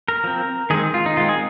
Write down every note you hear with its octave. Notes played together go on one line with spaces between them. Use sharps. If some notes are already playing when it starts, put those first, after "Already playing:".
A#4
F3 C4
D#3 G#3 C4 G#4
F4
D#4
D#3 G#3 C4 F4
G#4